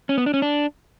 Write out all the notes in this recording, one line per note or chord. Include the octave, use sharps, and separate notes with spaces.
C#4
B3
D4
C#4
D4